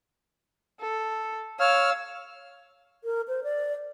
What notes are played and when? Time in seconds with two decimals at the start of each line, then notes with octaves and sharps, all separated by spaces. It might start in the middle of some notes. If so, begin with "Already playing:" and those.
0.80 A4
1.60 C#5 F5 E6 F6
3.04 A#4
3.28 C5
3.44 D5